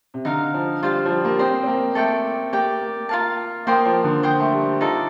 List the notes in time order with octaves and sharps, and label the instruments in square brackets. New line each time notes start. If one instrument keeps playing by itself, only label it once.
[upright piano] C3
[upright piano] D3 [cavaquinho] D#4 A#4 F5
[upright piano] F3
[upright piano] G3 [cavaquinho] F4 C5 F5
[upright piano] F3
G3
A#3
[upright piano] C4 [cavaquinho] C5 D#5 G5
[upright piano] C4
A#3
[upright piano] A3 [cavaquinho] A4 D5 G5 D6
[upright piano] A#3 [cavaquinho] G4 D5 G5
[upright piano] A#3
[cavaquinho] F4 A#4 F5 A5
[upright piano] A#3 [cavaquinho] C5 G5 C6 D#6
[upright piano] F3
D3
[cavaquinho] C5 G5 C6 D#6
[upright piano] A3
G3
[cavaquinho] D#4 A4 D5 [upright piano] F4